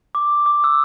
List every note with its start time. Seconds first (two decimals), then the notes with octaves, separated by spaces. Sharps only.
0.15 D6
0.46 D6
0.64 E6